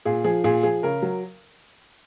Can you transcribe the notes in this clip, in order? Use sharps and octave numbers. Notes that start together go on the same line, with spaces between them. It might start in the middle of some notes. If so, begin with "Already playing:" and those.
A#2 G#4
F3 G#4
A#2 G#4
F3 G#4
C#3 A#4
F#3